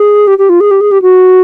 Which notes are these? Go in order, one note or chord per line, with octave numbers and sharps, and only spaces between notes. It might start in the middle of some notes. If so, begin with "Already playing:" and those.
Already playing: G#4
G4
G4
F4
G#4
G4
G#4
G4
F#4